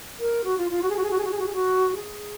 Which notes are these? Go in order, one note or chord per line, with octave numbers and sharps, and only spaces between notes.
A#4
F#4
F4
F4
F#4
G#4
F#4
G#4
F#4
G#4
F#4
G#4
F#4
G#4
F#4
G#4